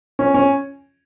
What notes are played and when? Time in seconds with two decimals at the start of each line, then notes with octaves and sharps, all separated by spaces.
0.19 C#4
0.34 C#4